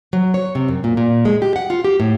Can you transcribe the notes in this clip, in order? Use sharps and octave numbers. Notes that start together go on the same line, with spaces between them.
F#3
C#5
C3
F#2
A#2
A#2
G#3
G4
F#5
F4
G4
A2